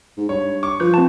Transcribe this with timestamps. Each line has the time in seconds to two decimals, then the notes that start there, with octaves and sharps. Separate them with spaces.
0.17 G#2
0.29 G2 C#5
0.63 C#6 D6
0.80 F3 B4 G6
0.94 C4 A5